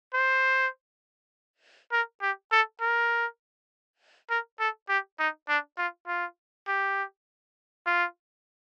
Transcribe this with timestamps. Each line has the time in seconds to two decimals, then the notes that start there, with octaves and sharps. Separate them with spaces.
0.14 C5
1.92 A#4
2.22 G4
2.52 A4
2.81 A#4
4.30 A#4
4.59 A4
4.89 G4
5.19 D#4
5.49 D4
5.78 F4
6.07 F4
6.68 G4
7.86 F4